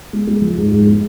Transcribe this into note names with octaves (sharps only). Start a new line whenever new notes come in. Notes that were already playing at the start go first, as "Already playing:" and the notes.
G#3
G#3
F3
G#2
G#2
G#3